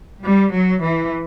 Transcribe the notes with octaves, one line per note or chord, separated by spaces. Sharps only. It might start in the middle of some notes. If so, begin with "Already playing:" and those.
G3
F#3
E3